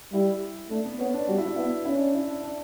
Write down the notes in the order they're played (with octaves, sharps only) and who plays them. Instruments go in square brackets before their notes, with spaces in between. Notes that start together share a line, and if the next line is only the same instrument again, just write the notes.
[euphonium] G3 [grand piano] E4
[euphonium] A3 [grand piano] D4
[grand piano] B3
[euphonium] B3 [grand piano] C#4
[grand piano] D4
[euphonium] G3 [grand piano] F#4
[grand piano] E4
D4
[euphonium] B3 [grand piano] E4
[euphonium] C#4 [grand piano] E4
[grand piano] D4
E4
D4
D4